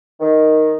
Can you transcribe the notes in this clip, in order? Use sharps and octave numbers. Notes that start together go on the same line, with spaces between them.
D#3